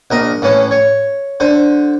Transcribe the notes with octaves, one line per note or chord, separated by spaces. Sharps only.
A#1 A#4 D#5
A2 E3 C#4
C#5
D3 C5